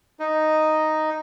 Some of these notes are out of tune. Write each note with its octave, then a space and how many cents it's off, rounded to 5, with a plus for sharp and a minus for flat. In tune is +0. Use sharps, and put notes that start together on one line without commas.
D#4 +0 D#5 +0